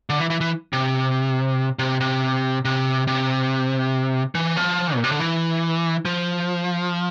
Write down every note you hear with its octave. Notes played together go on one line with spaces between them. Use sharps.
D3
E3
E3
E3
C3
C3
C3
C3
C3
E3
F3
A#2
C3
D3
E3
F3